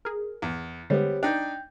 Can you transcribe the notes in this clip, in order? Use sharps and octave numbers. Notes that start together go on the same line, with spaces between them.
G#4 A#4
E2
D3 G3 G#3 B3 G4 C5 C#5
D4 D#4 G5 G6